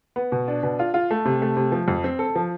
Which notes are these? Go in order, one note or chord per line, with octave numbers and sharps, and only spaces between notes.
B3
B2
D4
B2
F4
F4
A3
C3
A3
C3
F3
F2
C4
A4
F3